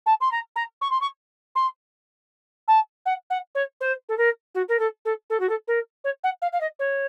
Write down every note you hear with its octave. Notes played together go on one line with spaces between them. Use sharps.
A5
C6
A#5
A#5
C#6
C6
C#6
C6
A5
F#5
F#5
C#5
C5
A4
A#4
F#4
A#4
A4
A4
A4
F#4
A4
A#4
C#5
F#5
F5
F5
D#5
C#5